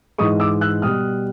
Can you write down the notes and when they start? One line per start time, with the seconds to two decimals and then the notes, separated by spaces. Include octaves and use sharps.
0.18 G#2 E3 G#3 C#6 D#6
0.40 D6 E6
0.61 E6 F#6
0.82 B2 G3 D#6 F6